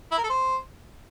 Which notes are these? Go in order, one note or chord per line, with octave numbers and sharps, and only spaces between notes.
E4
A#4
A4
C5